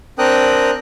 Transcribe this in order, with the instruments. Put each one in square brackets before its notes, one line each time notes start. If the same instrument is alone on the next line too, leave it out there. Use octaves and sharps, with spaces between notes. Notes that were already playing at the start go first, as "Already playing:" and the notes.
[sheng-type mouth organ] C4 D4 A#4 G5 D#6 F#6